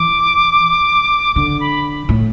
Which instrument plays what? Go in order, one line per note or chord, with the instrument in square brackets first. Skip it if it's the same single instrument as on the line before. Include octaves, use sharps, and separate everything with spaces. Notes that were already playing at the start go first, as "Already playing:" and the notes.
Already playing: [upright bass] E3 [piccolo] D6
[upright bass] D3 [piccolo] D6
[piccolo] B5
[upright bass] A2